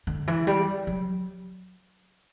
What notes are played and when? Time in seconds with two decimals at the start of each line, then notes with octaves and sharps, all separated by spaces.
0.07 D3
0.27 E3
0.47 G3
0.87 F#3